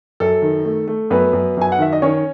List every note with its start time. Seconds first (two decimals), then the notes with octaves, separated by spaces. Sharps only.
0.20 F#2 A4
0.42 D#3
0.65 A3
0.88 A3
1.10 F#2 B3 B4
1.33 F#2
1.57 F#2 G#5
1.72 F#5
1.79 D#3 E5
1.93 D#5
2.02 D#3 C#4 C#5